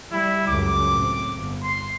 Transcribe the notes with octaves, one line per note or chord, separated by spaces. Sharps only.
G3 E4
C#2 F#2 D6
A2 C4
G1
C6